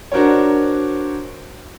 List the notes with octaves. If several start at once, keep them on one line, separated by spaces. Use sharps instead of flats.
D4 F#4 A#4 C5 C#5